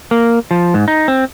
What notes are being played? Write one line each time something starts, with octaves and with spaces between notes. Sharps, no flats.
A#3
F3
G#2
D#4
C4